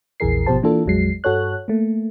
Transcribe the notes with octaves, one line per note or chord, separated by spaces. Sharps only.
A#1 E2 E3 G#4 A#4 C7
G#1 B2 F3 G4 C5 A5
E3 A#3 D4 F4 A4
A#1 F2 F#3 G#3 C7
G2 F#4 A4 C#5 F#6
A3 A#3